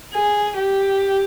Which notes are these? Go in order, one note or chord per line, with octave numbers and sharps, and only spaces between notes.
G#4
G4